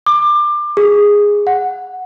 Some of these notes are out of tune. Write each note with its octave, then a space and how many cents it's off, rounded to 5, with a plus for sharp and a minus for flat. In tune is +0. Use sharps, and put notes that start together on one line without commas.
D6 +25
G#4 -10
F#5 -5